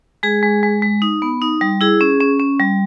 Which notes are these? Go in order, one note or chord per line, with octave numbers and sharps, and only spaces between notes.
G#3 G#4
G#3
G#3
G#3
D#4
B3
D#4
G3
E4 G#4
C#4
C#4
C#4
G3